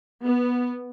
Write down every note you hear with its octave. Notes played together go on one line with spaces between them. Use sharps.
B3